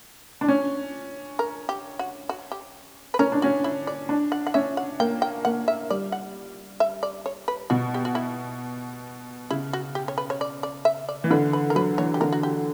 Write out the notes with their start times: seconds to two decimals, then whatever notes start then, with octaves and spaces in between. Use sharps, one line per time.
0.41 D4
0.48 C#4
1.39 A#4
1.69 G4
1.99 F#4
2.29 F#4
2.52 G4
3.14 B4
3.19 C#4 A#4
3.32 D4
3.42 C#4 F#4
3.64 E4
3.87 D5
4.09 D4
4.32 F#5
4.47 F#5
4.54 C#4 E5
4.77 F#5
5.00 A#3 G5
5.22 G5
5.45 A#3 F#5
5.68 E5
5.90 G3 D5
6.12 F#5
6.80 E5
7.03 D5
7.26 C#5
7.48 B4
7.70 B2 F#4
7.94 G4
8.05 F#4
8.15 E4
9.50 C#3 E4
9.73 F#4
9.95 G4
10.08 C#5
10.18 B4
10.30 C#5
10.41 D5
10.63 D5
10.85 E5
11.09 D5
11.24 E3
11.31 D3 B4
11.53 B4
11.70 A#4
11.75 F#3 B4
11.98 E3 C#5
12.14 G4
12.21 D3 A#4
12.33 F#4
12.43 G4